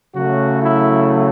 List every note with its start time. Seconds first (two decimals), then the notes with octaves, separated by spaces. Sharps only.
0.14 C#3 F#3 A3 F#4
0.63 E4